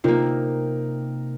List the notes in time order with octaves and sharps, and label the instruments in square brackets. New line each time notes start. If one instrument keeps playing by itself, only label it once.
[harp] C3 A#3 [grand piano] D#4 A#4 [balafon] F4